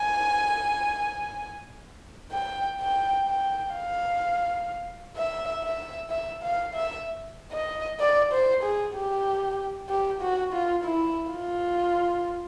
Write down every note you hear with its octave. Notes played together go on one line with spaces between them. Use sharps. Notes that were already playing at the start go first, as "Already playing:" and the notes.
Already playing: G#5
G5
G5
G5
F5
E5
E5
E5
F5
E5
D#5
D5
C5
G#4
G4
G4
F#4
F4
E4
F4